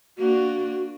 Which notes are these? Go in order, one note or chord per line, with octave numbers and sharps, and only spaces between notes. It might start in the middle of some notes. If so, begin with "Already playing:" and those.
A#3 D4 F#4